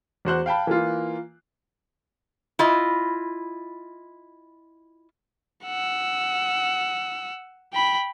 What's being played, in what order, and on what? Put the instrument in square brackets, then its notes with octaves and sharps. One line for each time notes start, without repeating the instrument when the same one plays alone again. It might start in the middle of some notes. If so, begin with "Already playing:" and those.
[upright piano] E2 F#4 C5 F#6
F5 G5 A5 B5
E3 A#3 F4
[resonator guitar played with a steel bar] E4 F4 D#5
[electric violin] F#5 E6
G5 B5